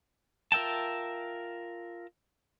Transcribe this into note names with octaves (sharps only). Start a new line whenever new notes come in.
F4 A#4 E5 G5 A5